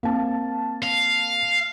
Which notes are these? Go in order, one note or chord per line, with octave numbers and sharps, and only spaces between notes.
A#3 C4 A5
F5